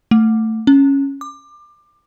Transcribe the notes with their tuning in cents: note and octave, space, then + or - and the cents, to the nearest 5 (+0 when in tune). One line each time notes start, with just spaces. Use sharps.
A3 +15
C#4 -5
D6 +25